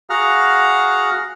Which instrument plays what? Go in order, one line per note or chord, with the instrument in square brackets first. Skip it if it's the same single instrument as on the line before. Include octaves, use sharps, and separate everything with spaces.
[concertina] F#4 G#4 F5 F#5 A#5 F6